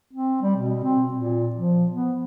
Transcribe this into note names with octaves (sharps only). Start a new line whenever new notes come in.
C4
G3
B2
C4
A#2
F3
B3